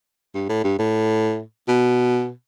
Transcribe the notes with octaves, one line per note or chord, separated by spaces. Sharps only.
G2
A2
G2
A2
B2